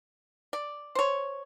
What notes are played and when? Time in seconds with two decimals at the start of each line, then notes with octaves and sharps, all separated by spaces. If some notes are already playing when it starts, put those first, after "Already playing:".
0.53 D5
0.95 C5 C#5